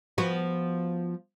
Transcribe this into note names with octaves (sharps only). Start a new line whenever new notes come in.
F3 B3 F#4